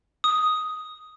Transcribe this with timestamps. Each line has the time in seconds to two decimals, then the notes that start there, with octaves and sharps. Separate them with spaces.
0.24 D#6